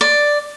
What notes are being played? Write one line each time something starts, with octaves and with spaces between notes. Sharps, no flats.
D5